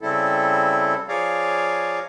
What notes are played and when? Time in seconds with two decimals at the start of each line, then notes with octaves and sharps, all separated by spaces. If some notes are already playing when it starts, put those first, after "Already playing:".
0.01 C#3 G3 C4 E4 A4
1.09 F3 G#4 C#5 D5 F5 A#5